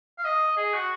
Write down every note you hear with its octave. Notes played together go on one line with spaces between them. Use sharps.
F5
D#5
G#4
F#4